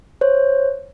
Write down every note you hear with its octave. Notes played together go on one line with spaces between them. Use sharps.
C5 C#5